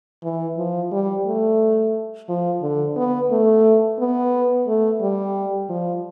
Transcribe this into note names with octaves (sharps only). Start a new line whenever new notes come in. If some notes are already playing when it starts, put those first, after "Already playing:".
E3
F3
G3
A3
F3
D3
B3
A3
B3
A3
G3
F3